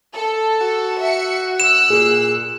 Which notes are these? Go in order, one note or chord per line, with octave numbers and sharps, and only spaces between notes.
A4
F#4
E5 C#7
E6 F#6 E7
A#2 G#4